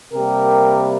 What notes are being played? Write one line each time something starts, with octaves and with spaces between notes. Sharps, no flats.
C3 G3 A#3 G4 A#4